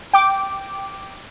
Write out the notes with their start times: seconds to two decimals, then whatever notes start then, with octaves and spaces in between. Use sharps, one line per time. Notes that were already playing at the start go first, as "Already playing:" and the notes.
0.13 G5 D6